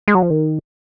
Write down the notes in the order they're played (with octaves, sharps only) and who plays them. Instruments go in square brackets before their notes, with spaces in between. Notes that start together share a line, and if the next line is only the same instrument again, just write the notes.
[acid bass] G#3
F#3
F3
D#3